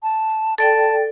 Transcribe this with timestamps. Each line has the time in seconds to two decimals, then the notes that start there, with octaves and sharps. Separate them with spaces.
0.03 A5
0.58 A4 D5 G5 A5